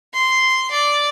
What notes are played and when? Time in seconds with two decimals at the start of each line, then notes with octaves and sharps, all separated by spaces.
0.14 C6
0.71 D5